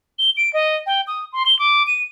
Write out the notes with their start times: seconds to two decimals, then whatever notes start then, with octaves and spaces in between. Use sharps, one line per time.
0.19 G7
0.37 D7
0.54 D#5
0.87 G5
1.07 D#6
1.33 C6
1.46 G7
1.59 D6
1.87 D#7